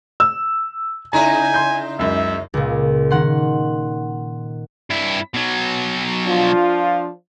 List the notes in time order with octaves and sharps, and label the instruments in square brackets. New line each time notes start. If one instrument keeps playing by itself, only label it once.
[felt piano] E6
[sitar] C#3 D#4 E4 [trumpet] G#5 [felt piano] A#5
[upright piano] C6 G6
[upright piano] C#2 F#2 [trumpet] E5
[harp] C#2 A#2
D#3 F#5 C6
[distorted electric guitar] G2 E4
B2 F#3
[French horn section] F3 D4 F4